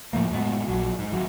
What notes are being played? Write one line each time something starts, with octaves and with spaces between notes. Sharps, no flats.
A2 F3 A3 A#3
F#2 A2 G#3 B3
A#1 F#3
G#2
G#1 F#3